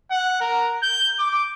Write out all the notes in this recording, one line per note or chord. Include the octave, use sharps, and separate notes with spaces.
F#5
A#4
G6
D6